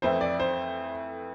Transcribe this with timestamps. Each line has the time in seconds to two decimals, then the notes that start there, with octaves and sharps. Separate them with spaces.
0.02 F2 E3 A3 E4 C5
0.21 D5
0.40 C5